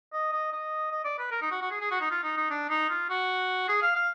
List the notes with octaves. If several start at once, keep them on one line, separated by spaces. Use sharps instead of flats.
D#5
D#5
D#5
D#5
D5
B4
A#4
D#4
F#4
F#4
G#4
G#4
F#4
D#4
F4
D#4
D#4
D4
D#4
F4
F#4
G#4
F5
F5